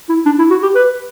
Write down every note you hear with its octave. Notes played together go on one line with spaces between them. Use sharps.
E4
D4
E4
F#4
G4
B4